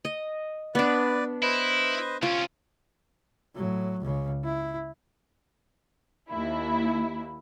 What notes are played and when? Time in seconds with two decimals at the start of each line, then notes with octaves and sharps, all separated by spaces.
0.05 D#5
0.75 B3 D4 B4 D5
1.42 E4 B4 C5 D#5
2.23 C2 C#4 F4 C#6
3.56 A2 F#3
4.01 C#2 C#3
4.44 E4
6.30 D#2 E4